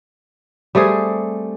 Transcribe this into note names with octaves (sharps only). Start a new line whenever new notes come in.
G3 A3 C4 G#4